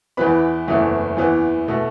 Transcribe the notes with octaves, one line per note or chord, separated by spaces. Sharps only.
E2 E3 B3 B4 B5
F#1 E2 E3 A3
E2 E3 B3
B2 A3